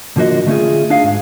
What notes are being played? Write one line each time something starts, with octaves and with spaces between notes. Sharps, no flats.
A2 D3 F3 A#3 F#4 D#5
D3 A3 C#4 F4 G#4
D4 D#4 G#4 F5
G#2